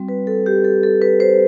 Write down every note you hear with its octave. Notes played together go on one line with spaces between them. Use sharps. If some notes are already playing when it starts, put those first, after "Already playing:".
Already playing: G3 C4 F#4
B4
A4
G4
A4
A4
B4
C5